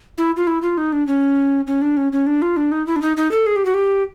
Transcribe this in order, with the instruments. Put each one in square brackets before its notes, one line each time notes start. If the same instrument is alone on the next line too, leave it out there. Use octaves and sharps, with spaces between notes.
[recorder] E4
F4
E4
F4
D#4
D4
C#4
C#4
D4
C#4
C#4
D4
F4
D4
D#4
E4
D4
D#4
D#4
A4
G#4
G4
F#4
G4